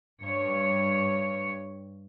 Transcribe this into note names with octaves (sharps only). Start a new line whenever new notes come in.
G2 C#5